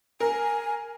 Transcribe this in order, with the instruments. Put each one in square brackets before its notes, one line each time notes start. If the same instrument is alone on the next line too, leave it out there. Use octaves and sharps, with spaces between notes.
[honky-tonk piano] A#4 [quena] G#5